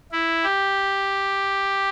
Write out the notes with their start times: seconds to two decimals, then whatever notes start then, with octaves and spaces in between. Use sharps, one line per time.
0.12 E4
0.44 G4